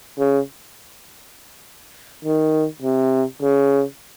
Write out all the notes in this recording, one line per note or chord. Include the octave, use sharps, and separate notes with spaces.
C#3
D#3
C3
C#3